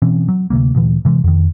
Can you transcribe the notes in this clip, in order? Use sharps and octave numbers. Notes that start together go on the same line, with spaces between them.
B2 E3 C4 C#4
F#3
D2 C3 G3 A#3
D2 A#2 E3
C3 E3 G#3
F2 D#3